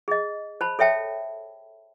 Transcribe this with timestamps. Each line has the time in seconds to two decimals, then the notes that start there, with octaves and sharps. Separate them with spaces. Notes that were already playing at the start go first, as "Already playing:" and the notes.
0.08 G#4 D#5
0.61 C5 A5 B5
0.79 A4 C#5 E5 G5 A5